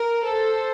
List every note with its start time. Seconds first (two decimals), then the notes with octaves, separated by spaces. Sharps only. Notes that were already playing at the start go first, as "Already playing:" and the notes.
Already playing: A#4
0.25 A4 C5